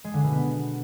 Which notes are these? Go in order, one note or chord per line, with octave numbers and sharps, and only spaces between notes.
G#3
D3
B2
B3